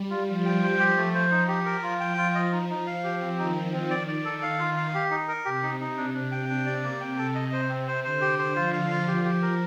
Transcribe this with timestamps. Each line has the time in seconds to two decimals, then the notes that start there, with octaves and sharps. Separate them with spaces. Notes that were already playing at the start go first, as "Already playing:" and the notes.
Already playing: G3
0.10 F4
0.28 F3 F4
0.45 G5
0.63 C5
0.80 G4
0.97 A3
1.14 C5
1.31 F3 D#4
1.48 G4
1.66 A#4
1.83 F3 F4
2.00 G5
2.17 F4
2.35 F3 D#5
2.52 D#4
2.70 D#4
2.87 F5
3.04 G4
3.21 C4
3.39 D#3 D#4
3.56 C4
3.73 C4
3.90 D5
4.08 D5
4.25 A4
4.42 F5
4.59 F4
4.77 F5
4.94 G4
5.11 D#4
5.28 A#4
5.45 C3 G4
5.63 D#4
5.81 D#4
5.97 D4
6.14 D4
6.32 G5
6.49 C3 D4
6.66 D5
6.83 A#3
7.01 G5
7.18 A4
7.35 D#5
7.52 C5
7.69 C4
7.87 C5
8.04 D3 C5
8.21 G4
8.39 C5
8.56 F3 F4
8.73 F5
8.91 F4
9.08 F3 G4
9.25 G4
9.42 A#4